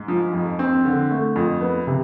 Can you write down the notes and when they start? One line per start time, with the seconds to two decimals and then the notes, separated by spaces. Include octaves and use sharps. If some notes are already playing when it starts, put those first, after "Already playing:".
Already playing: G#2
0.08 F3
0.33 F2
0.59 C4
0.85 D3
1.11 A3
1.36 F2
1.61 B3
1.87 C3